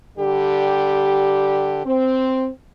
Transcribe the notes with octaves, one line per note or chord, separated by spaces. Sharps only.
D3 G3 G4
C4